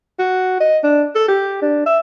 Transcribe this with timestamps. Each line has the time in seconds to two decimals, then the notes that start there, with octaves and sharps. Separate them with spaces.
0.19 F#4
0.60 D#5
0.84 D4
1.15 A4
1.28 G4
1.62 D4
1.86 E5